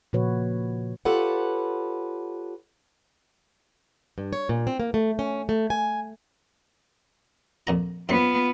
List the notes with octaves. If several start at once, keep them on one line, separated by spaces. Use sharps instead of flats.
A#2 C#3 F3 F#4 B4 C#5
F4 G4 A4 B4 C#5 F#5
G2
C#5
A#2
C4
A#3
A3
C#4
A3
G#5
F2 A#2 A#5
F#2 B3 C4 F4